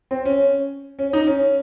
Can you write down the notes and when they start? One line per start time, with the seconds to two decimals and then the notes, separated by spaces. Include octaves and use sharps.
0.11 C4
0.25 C#4
0.99 C#4
1.13 D#4
1.27 C#4